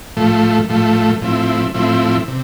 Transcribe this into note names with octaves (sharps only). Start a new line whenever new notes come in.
A2 F3 A3
A2 F3 A3
A2 F3 C4 E4
A2 F3 C4 E4
C3